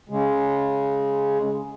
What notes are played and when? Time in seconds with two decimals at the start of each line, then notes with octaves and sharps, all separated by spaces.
0.09 C#3 G#3